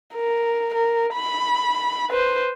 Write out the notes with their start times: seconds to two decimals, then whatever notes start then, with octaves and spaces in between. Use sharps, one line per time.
0.15 A#4
0.75 A#4
1.14 B5
2.10 B4 C5